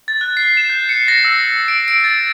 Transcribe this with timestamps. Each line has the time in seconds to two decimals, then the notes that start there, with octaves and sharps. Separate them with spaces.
0.08 A6
0.21 F#6
0.37 C7
0.57 E7
0.70 G6
0.89 C#7
1.08 A#6
1.25 E6
1.54 C#7
1.68 D7
1.88 D7
2.04 A6